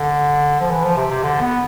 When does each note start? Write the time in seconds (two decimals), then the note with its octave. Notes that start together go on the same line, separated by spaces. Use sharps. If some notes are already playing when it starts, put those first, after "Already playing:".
Already playing: D3
0.60 F3
0.70 E3
0.83 F3
0.97 C3
1.10 C3
1.23 D3
1.41 B3